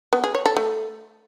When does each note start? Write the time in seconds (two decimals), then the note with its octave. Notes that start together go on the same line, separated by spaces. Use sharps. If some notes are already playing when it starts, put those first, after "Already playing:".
0.13 B3
0.24 G#4
0.35 C#5
0.46 A4
0.57 A3